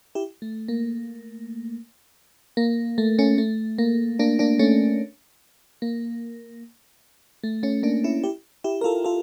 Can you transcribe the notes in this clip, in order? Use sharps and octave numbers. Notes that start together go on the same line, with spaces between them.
E4 G4
A3
A#3
A#3
A3
A3 C#4
A3
A#3
A#3 D4
A#3 D4
A3 C#4
A#3
A3
A3 C#4
A#3 D4
C#4 E4
E4 G4
E4 G4
A#4
F4 A4
F4 A4